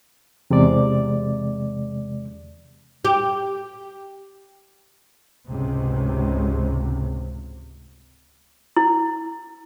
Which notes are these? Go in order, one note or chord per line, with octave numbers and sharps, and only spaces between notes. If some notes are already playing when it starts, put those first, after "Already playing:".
E2 C3 G#3 D5
G4
G#1 C#2 A2 C3
E4